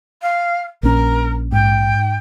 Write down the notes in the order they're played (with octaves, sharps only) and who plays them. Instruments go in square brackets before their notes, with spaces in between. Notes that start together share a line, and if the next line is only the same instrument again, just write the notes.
[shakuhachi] F5
[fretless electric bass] A#1 C#4 [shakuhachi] A#4
[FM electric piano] G#2 [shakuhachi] G5